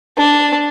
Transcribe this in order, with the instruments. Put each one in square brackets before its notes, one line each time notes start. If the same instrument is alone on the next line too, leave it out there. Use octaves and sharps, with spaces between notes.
[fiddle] D4